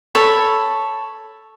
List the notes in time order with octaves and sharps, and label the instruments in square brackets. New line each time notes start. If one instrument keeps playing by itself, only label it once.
[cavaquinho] A4 C#5 B5